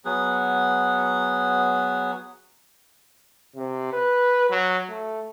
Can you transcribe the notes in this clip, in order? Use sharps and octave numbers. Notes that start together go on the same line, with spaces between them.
F#3 B3 G#4 F#5
C3
B4
F#3
A3